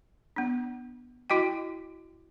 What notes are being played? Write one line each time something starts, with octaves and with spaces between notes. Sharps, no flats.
B3 D4
E4 F#4 D#5 G5